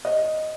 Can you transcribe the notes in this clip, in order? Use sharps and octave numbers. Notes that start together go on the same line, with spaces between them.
D#5